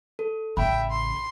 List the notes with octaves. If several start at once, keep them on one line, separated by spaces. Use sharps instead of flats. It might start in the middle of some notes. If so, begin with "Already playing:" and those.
A4
A1 C#3 E5 G5 B5
C6